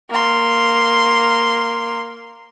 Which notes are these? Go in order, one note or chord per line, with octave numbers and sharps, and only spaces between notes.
A#3 C6